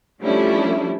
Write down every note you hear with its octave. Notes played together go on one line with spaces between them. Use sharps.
F3 G3 A3 C#4 D4 E4